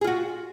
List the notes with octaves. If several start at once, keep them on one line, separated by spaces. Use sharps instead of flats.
F4 F#4 G#4